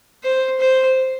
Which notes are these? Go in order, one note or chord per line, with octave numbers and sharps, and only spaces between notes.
C5
C5